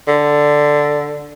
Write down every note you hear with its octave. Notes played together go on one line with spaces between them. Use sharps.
D3